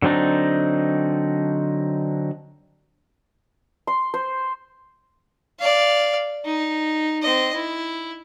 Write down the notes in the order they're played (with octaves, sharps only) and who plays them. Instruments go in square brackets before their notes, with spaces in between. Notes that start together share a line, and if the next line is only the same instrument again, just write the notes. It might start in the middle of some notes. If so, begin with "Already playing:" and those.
[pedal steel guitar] D3 F#3 C4 D4 D#4
[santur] C6
C5
[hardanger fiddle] D5 F5
D#4
C4 D#5
E4